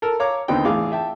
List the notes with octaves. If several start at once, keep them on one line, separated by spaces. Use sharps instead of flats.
A4 A#4
C#5 F5 A#5 D6
D#2 D3 B3 C4 D#4 G5
A1 G#4 F5 D6
E5 G5 A5